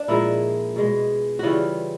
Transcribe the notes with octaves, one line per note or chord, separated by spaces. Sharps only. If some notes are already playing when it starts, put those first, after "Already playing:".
Already playing: D4
A#2 F3 G#3 E4
B2 G#3
C#3 E3 G3 F4 F#4